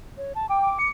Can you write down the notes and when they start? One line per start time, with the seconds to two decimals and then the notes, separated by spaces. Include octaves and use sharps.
0.18 C#5
0.35 A5
0.49 G5 D6
0.62 D6
0.79 C#7